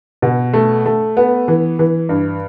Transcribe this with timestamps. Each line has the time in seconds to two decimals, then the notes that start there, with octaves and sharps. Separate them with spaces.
0.22 B2
0.53 A3
0.86 A3
1.17 B3
1.48 E3
1.79 E3
2.09 G2